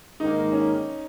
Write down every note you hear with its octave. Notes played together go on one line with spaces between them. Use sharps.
G#2 D#3 A#3 D#4
C#4